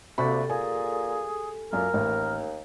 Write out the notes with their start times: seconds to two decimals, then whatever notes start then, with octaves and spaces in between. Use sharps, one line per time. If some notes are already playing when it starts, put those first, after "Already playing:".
0.18 D2 C3 A#3 F#4 G4 A4 B5
0.50 A#2 G#4 G#5
1.73 F#2 A#2 A#4
1.93 A1 D#2